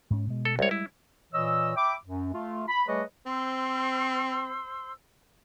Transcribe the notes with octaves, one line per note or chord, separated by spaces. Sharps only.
G#2 C#4
B2 G#3
A4
C2 G3 G#3 C#5
E4
A#2 E3 C#5 D#5 E6
E5 G5 B5 D6
F#2
A3 F4
B5
G3 A3 G#4 B4 C#5 D#5
C4 C5 C6 E6